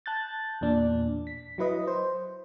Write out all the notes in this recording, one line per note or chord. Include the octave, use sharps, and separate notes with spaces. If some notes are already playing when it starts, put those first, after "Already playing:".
A5 F#6 G6 A6
E2 A#2 D4
B6
F#3 E4 B4 D#5
C5